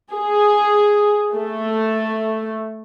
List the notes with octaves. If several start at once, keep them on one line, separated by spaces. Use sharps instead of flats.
G#4
A3